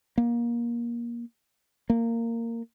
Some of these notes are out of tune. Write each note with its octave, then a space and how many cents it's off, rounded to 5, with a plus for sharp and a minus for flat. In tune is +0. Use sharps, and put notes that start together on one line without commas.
A#3 +20
A#3 -15